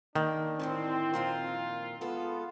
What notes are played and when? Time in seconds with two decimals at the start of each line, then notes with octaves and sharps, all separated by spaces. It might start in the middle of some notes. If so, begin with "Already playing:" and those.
0.15 D#3 A#3 D4
0.59 A2 D3 E3 C4
1.14 F2 A#2 F4 A#4
2.01 G#3 B3 F4 A4